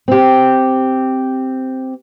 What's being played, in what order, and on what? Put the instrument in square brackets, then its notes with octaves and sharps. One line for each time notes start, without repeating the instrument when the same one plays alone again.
[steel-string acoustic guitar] C4 G4